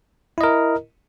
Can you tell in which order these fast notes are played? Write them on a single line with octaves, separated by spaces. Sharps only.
E4 D#5 A#4